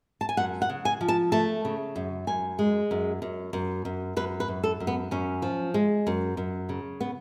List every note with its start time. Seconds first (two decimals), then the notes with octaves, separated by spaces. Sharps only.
0.21 A5
0.29 G#5
0.37 F#2 F#5
0.62 F#5
0.69 C#3
0.85 G#5
1.01 F3
1.08 A5
1.32 A3 A5
1.65 C#3
1.96 F#2
2.27 F#2 G#5
2.59 G#3
2.91 F#2
3.22 F#2
3.53 F#2
3.85 F#2
4.17 F#2 B4
4.40 B4
4.48 F#2
4.64 A4
4.80 F#2
4.87 B3
5.11 F#2 C#4
5.42 F3
5.74 G#3
6.07 F#2
6.37 F#2
6.69 C#3
7.01 B3